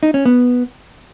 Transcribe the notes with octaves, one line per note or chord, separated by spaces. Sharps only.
D#4
C#4
B3